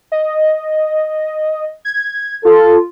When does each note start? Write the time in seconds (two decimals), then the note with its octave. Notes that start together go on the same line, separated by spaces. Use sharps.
0.12 D#5
1.85 G#6
2.45 F4 A4